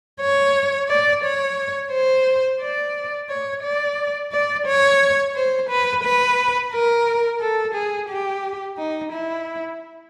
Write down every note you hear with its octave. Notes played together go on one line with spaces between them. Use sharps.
C#5
D5
C#5
C5
D5
C#5
D5
D5
C#5
C5
B4
B4
A#4
A4
G#4
G4
D#4
E4